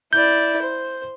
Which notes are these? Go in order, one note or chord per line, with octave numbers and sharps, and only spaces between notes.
E4 D5 G6
C5